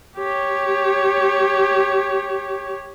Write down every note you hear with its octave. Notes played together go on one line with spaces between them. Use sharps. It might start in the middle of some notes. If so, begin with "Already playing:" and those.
G4 C#5